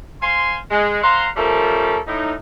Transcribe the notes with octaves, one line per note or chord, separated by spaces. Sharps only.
C5 F5 G#5 C6
G#3
C5 F5 F#5 A#5 C6
F3 G3 A3 C#4 A4 A#4
A2 D#4